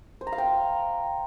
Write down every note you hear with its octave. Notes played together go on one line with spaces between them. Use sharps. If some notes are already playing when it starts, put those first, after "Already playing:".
C5
A#5
F5
G5